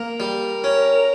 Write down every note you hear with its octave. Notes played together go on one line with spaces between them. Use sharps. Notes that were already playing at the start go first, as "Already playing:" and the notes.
Already playing: A#3 A#4
G3
C#4